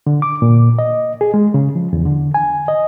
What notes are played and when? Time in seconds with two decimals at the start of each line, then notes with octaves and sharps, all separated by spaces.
0.07 D3
0.22 D6
0.42 A#2
0.79 D#5
1.21 G#4
1.34 G#3
1.54 C#3
1.75 F3
1.93 E2
2.05 D3
2.34 G#5
2.68 D#5